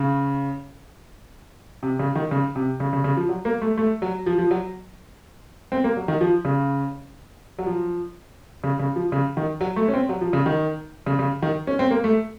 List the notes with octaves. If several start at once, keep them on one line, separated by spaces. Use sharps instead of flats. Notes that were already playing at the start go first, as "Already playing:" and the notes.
Already playing: C#3
C3
C#3
D#3
C#3
C3
C#3
C#3
C#3
F3
F#3
A#3
A3
A3
F#3
F3
F3
F#3
C4
A#3
F#3
D#3
F3
C#3
F#3
F3
C#3
C#3
F3
C#3
D#3
F#3
A3
C#4
C4
F#3
F3
C#3
D#3
C#3
C#3
D#3
C#4
C4
A#3
A3